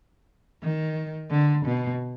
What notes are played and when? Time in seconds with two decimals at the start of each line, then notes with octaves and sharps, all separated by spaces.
0.63 D#3
1.31 D3
1.66 B2